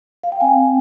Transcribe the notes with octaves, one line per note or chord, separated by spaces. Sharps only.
F5
G5
C4 G#5